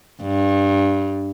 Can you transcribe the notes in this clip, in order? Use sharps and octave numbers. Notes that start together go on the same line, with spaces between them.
G2